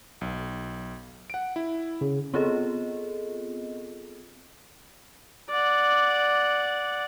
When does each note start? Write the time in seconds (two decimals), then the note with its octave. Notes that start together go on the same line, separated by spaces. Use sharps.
0.21 B1
1.30 F#5 D7
1.56 E4
2.01 C#3
2.34 B3 C4 F4 G#4 A4 D#5
5.50 D5 F#5